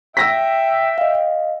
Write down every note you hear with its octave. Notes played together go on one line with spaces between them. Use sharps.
E5 G5 E6 A#6 B6
D#5 F5